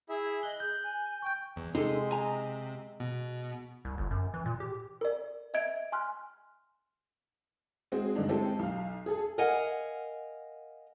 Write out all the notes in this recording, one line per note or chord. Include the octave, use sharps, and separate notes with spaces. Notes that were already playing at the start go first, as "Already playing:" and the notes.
E4 G#4 E5
D#5 F#6 G7
G#4 G6
G#5
G5 C#6 G6
E2
C3 G#3 D#4 A4 C6
D#5 G#5 A#5
B2
C2
G1
F#2
E3
A#2
G4
A#4 D5
D#5 E5 G#6 D7
G#5 C6 F6 F#6
G#3 C4 F#4 G#4
G2 D3 E3 D4 D#4
G#3 C4 E4 G4 A4
B1 F5
G#4 A4
A#4 D#5 F5 F#5 G#5